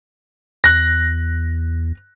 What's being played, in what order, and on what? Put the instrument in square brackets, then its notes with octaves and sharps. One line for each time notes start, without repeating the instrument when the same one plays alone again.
[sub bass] E2 [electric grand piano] F#6 A#6